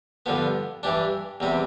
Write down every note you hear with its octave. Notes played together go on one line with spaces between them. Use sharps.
G2 D3 F3 B3
G2 E3 G3 D4
E2 C3 G3 C4